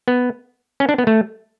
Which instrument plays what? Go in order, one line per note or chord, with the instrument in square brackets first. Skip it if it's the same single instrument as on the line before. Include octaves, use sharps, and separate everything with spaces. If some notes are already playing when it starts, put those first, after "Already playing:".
[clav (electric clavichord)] B3
C#4
D4
B3
A3